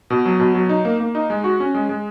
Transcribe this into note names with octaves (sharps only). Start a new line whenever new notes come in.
B2
F#3
B2
F#3
D#4
A#3
A#3
D#4
G#3
F#4
C#4
G#3
G#3